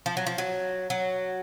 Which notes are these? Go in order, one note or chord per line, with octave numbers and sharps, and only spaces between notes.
F3
F#3
F3
F#3
F#3